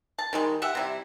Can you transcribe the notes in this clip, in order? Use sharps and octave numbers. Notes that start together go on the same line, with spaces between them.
A5
D#3 G3 G#3
G4 E5 F#5
C3 G3 E4